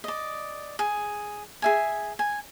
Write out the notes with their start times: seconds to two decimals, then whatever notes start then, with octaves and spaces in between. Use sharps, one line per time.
0.04 D5 D#5
0.79 G#4
1.62 G#4 E5 G#5
2.19 G#5